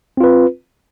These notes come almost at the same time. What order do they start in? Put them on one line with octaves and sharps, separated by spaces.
C4 F4 B4